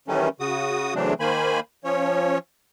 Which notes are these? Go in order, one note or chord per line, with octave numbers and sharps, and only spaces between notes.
D#3 E3 F#3 G3 A3 C#4
C#3 F#4 D#6
C#3 E3 F#3 A3 C4 D4
D#3 A#3 C5 G#5 B5
F3 C#4 C#5